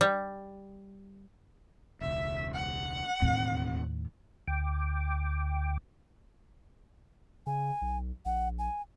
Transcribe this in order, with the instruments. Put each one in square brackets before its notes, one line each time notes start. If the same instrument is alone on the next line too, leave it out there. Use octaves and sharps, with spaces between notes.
[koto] G3
[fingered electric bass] E1 C#2 [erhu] E5
[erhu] F#5
[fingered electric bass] E1 C4 [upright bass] D#2 A2
[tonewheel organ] D2 G5 D6
[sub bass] C#3 [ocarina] G#5
[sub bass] B1
[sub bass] A#1 [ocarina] F#5
[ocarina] G#5